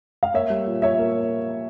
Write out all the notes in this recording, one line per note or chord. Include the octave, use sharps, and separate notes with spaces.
F5
A#3 C#5 E5
G3
A#2
A#2 C#5 E5
A#3